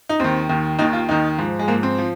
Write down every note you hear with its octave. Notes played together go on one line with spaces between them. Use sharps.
D#4
D#2 D#3 C4
D#2 D#3
D#2 D#3 D#4
F4
D#2 D#3 D#4
G#2 F3
G#3
G#2 F3 A#3
C4
F3